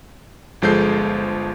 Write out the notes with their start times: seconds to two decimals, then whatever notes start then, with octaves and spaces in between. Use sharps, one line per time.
0.62 G1 F3 G#3 A4 G6 C7